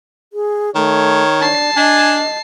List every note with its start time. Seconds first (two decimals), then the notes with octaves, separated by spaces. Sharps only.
0.33 G#4
0.75 D#3 A3 C#5
1.41 D4 A5 C7
1.77 D4 D#5 G#5